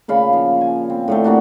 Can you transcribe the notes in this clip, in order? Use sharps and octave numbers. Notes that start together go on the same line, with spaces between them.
A#2 C#3 F5 B5
F3
G#5
C4
A2 D3 A3
C3 A#3 D4 F#4